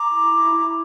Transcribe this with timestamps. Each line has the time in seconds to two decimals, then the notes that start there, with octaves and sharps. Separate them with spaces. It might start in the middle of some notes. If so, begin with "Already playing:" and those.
Already playing: A#5 D6
0.09 E4
0.31 E4
0.52 E4